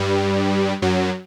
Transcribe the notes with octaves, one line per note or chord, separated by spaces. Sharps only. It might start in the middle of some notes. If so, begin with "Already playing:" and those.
Already playing: G2 G3
F#2 F#3